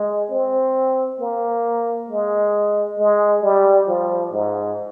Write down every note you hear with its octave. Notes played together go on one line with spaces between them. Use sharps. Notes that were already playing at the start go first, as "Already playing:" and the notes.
Already playing: G#3
C4
A#3
G#3
G#3
G3
F3
G#2